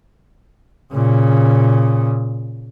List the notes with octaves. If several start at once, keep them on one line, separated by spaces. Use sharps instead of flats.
A#2 C#3